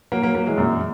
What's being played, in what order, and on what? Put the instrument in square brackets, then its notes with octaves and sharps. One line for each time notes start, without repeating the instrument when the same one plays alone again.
[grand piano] F#3 A#3
F#3 A#3
F#3 A#3
E3 G#3
F#2 A#2